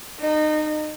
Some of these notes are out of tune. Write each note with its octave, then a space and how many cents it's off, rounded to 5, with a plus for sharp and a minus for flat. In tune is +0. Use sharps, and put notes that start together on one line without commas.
D#4 -25